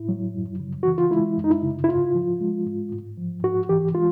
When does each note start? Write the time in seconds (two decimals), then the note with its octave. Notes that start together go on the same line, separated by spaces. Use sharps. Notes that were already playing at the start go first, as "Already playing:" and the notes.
Already playing: A2 E4
0.09 F#3
0.34 F#2
0.60 C#3
0.83 E3 F#4
0.98 F4
1.11 G#3 E4
1.37 F#2
1.44 D#4
1.51 E4
1.62 C#3
1.84 E4
1.88 G#2 F4
2.15 F3
2.40 G#3
2.65 G#2
2.92 G#2
3.17 F3
3.43 G#2 F#4
3.69 E3 G4
3.95 G#3 F4